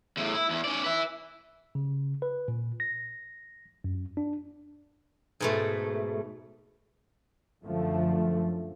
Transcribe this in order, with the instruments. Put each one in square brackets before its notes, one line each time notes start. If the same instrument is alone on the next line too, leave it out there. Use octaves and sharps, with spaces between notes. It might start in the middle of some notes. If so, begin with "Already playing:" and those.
[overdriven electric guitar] E2 A2
E4
E2
C#4 D5
B4 E5
[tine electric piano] C#3
B4
A#2
A#6
F#2
D4
[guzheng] G#2 B2 A3
[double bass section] F#2 D3 F3 A3